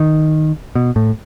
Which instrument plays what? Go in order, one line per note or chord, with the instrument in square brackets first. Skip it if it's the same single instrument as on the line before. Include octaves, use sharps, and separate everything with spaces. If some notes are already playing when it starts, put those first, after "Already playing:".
Already playing: [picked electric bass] D#3
B2
A2